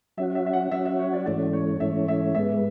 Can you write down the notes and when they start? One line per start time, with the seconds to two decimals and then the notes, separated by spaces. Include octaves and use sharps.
0.17 F#3 C#4 F#4 E5
0.35 E5
0.46 E5
0.53 F#5
0.71 F#3 C#4 F#4 E5
0.85 E5
0.99 C#5
1.13 D5
1.26 G#2 E3 A3 C#4 D5
1.53 C#5
1.80 G#2 E3 A3 C#4 E5
2.08 E5
2.35 G#2 G#3 B3 E5